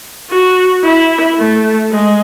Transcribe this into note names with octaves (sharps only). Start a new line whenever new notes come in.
F#4
E4
A3
G#3